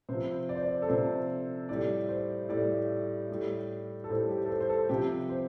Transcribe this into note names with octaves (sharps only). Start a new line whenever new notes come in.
C3 F3 C5
D5
C5
D5
A4
C3 F3 C5
A2 G3 D5
C5
A2 G3 D5
A2 G3
A4
A2 G3 C5
G4
A4
C5
C5
A4
C3 F3 G4
C5